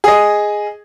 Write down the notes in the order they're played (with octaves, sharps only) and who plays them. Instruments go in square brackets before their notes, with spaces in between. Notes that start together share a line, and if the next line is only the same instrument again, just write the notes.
[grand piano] G#4 D#5